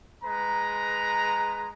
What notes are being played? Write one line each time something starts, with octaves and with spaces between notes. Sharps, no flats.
G#3 B4 A#5